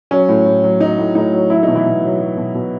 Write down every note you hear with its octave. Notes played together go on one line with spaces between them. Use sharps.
F#3 C#4
A2
A2
F#3
F#3 D#4
A2
A2 D#4
F#3
F#3 E4
B2 D#4
E3 E4
B2
F#3
F#3
B2
B2